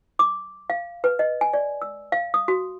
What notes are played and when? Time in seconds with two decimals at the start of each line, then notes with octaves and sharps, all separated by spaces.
0.19 D6
0.70 F5
1.04 B4
1.19 D#5
1.41 G#5
1.53 D5
1.82 E6
2.12 F5
2.34 D#6
2.48 F#4